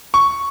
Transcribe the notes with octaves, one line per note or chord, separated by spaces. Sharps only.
C#6